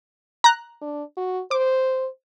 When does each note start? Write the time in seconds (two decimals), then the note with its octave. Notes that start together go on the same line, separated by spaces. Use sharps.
0.44 A#5 F#6
0.81 D4
1.17 F#4
1.51 C5 D6